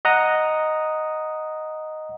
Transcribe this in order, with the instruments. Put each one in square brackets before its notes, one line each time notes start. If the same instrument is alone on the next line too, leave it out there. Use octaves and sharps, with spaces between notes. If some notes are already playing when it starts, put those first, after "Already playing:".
[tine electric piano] D#5 F#5 A#5 D#6